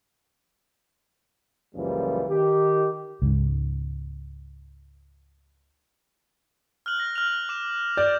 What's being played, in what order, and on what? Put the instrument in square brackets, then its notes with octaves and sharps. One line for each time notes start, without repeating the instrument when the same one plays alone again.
[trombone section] C#2 F#2 A#2 E3 F3 G3
D#3 G4
[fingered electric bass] C#2 G#2
[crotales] F6 F#6 F#7
A#6
F6 F7
D6 E7
[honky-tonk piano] D5 [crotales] G6